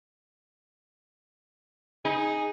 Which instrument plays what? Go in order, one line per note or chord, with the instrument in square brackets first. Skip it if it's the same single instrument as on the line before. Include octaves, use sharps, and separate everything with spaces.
[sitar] D#4 [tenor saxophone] G#4